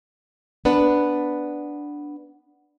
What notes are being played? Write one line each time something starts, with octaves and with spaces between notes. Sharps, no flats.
B3 D4 B4